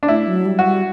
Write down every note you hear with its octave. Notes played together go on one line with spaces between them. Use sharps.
D4
A3 E4
F#3
G3
F#4
G3